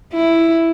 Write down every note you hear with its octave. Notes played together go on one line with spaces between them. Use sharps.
E4